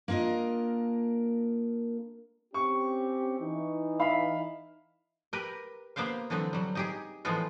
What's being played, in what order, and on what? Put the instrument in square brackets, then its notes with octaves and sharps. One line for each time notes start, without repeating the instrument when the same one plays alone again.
[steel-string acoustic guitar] A#3 D4 F4 A#4 D#5
[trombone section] C4 C#4 G4 [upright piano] C#6
[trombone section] E3 D#4
[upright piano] E5 F5 B5
[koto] G4 A#4 B4
A#3 B3 G4 C5 F5
D3 E3 F#3 B3 C4
F#3 G3
D#4 G4 G#4
A2 E3 F3 G#3 B3 F4